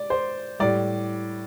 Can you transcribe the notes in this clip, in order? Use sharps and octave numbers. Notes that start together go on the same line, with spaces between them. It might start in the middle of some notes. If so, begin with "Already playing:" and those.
Already playing: D5
C5
A2 G3 D5